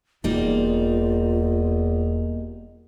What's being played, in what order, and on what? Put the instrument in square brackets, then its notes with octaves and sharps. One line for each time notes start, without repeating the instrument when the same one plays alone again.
[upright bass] E1 [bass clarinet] E2 [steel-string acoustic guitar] G3 A#3 D#4 [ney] F4